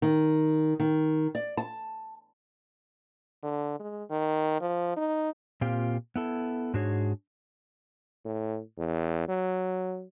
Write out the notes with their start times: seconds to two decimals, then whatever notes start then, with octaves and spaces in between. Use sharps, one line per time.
0.02 D#3
0.80 D#3
1.35 D5
1.57 A5
3.43 D3
3.80 G#3
4.11 D#3
4.61 F3
4.97 D#4
5.61 A#2 A#3 C4 F4 G4
6.16 B3 E4 A4
6.74 G#2 D4 F#4 G#4 C#5
8.25 A2
8.78 E2
9.29 F#3